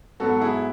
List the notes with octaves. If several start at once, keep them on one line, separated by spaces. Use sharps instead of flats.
G#2 F#3 B3 F#4 A4
E4 G#4